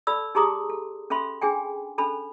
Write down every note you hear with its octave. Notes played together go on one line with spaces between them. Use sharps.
D#4 A4 D5 B5 E6
D#4 G4 G#4 A#5 C6 D#6
A4
C#4 A4 E5 B5 C6
D4 G#4 G5 G#5
C#4 D4 A4 B5